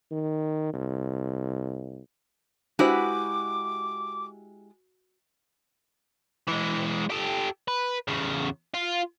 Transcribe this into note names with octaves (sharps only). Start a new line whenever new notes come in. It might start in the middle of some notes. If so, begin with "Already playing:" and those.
D#3
C2
G#3 D4 E4 F#4 G4 B4 C5 D6
E3 G#3
G4 A4
B4
E2 C#3
F4